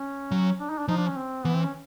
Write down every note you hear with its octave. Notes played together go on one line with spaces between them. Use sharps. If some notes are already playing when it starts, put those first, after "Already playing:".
Already playing: C#4
F#3
D4
D#4
D4
F3 D#4
D4
C#4
C4
E3 B3
C4
C#4